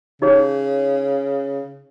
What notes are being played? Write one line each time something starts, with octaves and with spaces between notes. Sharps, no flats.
C#3 D#4 G#4 C#5